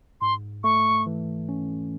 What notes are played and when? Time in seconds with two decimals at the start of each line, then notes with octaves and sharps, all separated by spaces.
0.21 G#2 C6
0.64 A3 C#6
1.06 E3
1.49 C#4